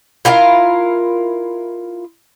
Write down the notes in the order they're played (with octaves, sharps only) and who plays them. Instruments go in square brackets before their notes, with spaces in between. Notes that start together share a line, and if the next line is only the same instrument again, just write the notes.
[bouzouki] E4 F4 A#4 F5